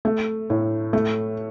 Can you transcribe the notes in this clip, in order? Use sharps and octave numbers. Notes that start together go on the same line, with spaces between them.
A3
A2
A3